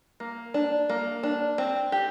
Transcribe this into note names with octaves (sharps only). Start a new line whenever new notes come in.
A#3
D4
A#3
D4
C4
G4